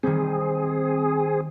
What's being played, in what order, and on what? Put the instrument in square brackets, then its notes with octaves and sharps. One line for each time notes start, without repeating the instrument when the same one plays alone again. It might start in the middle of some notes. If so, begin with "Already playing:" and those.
[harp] D#3 G3 [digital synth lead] C4 [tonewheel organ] G#4